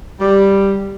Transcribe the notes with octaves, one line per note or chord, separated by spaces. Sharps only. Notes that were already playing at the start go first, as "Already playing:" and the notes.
G3